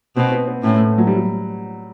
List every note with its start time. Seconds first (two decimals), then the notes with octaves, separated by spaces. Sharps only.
0.16 B2 C4
0.31 B3
0.47 B3
0.63 A2 C#4
0.74 A3
0.98 F#3
1.07 G3
1.16 F#3